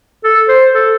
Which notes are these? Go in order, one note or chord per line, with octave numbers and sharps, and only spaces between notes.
A4
C5
A4